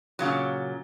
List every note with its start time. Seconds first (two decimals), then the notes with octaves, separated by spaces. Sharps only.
0.19 A#2 C#3 F#3